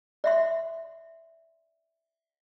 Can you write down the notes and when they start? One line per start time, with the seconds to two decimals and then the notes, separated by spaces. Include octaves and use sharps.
0.24 D5 E5 C6